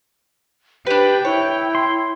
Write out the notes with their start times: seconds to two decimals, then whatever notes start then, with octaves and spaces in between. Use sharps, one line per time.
0.86 D4 G4 B4 G5
1.25 E4 C#5
1.75 C6